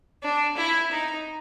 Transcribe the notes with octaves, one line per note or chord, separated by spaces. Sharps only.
D4
E4
D#4